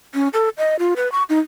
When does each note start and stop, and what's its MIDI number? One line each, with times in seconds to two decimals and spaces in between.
0.15 0.28 61
0.33 0.49 69
0.58 0.76 75
0.79 0.94 65
0.96 1.11 71
1.12 1.23 85
1.29 1.40 63